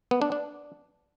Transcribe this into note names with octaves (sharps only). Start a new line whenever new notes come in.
B3
D4
D4